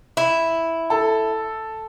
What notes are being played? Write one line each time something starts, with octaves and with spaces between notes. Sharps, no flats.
E4
A4